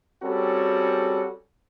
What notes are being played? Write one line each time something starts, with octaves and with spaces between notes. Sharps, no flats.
G3 C4 C#4 F#4 G#4 A4